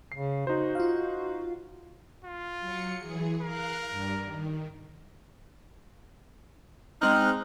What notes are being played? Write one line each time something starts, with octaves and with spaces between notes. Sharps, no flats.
C#3 C7
D#4 F#4 C5
F4 F5
F4
F#3 C#7
E3 G#4
A#4 F5 F#6
G2 G3
D#3
G#3 C4 D#4 F6 F#6